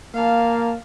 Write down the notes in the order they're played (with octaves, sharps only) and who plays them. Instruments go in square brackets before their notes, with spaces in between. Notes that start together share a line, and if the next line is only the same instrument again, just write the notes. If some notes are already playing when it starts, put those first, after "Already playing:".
[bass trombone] A#3 [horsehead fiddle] F5 A5